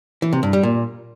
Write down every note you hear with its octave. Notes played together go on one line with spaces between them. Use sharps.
E3
C3
G2
G3
A#2